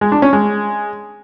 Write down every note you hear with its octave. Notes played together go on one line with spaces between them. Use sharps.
G#3
D4
C#4
G#3